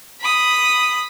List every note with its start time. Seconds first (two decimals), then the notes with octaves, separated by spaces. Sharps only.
0.21 B5 D#6